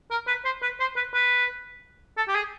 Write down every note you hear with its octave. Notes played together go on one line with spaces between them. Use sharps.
A#4
B4
C5
B4
C5
B4
B4
A4
G4
G#4